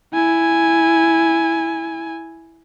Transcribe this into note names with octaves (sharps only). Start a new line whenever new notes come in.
E4 G#5